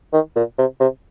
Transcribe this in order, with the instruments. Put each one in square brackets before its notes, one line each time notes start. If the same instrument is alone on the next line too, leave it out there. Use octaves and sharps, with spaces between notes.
[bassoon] D#3
A#2
C3
C3